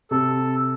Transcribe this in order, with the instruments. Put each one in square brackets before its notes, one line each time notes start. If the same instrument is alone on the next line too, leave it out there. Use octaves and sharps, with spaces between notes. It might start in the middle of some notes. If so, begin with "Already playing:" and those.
[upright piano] C3 [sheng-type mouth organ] A4